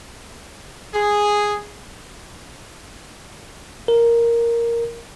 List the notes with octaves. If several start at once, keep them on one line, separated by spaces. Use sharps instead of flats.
G#4
A#4